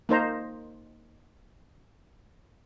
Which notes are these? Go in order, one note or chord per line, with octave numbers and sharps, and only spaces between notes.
A#3 D#4 C5 A#5